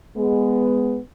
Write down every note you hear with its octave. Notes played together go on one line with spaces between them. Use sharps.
G#3 B3